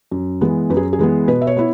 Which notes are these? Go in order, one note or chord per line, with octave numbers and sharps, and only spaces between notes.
F#2
E3 G#3 B3
F#2 B4
G#4
G#4
E3 G#3 B3
B2 B4
E5
C#5
B3 E4